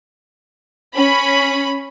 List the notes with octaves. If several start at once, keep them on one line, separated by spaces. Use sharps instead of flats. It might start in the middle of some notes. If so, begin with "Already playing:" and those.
C#4 B5